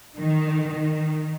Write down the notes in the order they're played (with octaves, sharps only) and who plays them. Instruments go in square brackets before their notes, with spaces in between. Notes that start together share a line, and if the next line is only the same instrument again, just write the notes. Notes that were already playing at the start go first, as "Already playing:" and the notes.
[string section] D#3
D#3